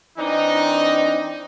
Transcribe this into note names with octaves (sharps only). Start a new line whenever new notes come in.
E3 C4 D4 D#4